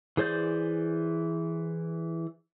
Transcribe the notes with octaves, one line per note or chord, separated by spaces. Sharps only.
E3 G#4 C5 D5 G6